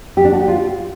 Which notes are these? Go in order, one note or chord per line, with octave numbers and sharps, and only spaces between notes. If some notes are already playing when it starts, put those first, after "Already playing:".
G4
D4
F#4
G4
F4